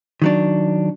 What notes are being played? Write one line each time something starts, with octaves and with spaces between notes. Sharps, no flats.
D#3 F#3 D4